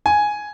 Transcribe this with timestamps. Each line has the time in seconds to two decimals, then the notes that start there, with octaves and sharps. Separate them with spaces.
0.06 G#5